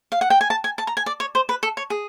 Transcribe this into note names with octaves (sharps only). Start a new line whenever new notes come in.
F5
F#5
G5
G#5
A5
G#5
A5
A#5
G#5
D5
C#5
C5
B4
A4
C#5
G#4